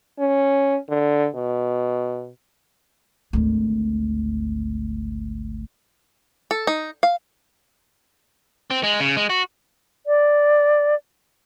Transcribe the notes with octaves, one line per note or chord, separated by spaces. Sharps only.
C#4
D3
B2
G#1 D2
A4
D#4
F5
C4
G#3
C#3
G#3
F#4
D5